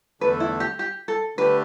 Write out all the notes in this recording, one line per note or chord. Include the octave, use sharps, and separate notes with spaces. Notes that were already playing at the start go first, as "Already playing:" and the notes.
E2 D3 A3 D4 A4 B4
E4
G4
G4
A4
D3 A3 D4 G4 B4